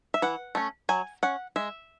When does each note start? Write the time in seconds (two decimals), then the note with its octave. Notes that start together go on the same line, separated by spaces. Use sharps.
0.14 E5
0.22 E3 F#5
0.55 A3 C#4
0.89 F#3 G#5
1.23 C#4 F#5
1.56 G#3 E5